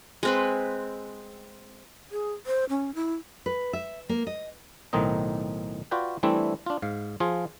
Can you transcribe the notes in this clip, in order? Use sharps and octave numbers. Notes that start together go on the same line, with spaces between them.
G#3 C4 B4
G#4
C5
C#4
E4
B4
E5
A#3
D#5
B1 A2 D#3 C4 D#4 D#5
F4 F#4 B4 D5 G5
E3 G3 A3 C4 D4 E4
D4 F4
G#2 F5
F3 F4 G#4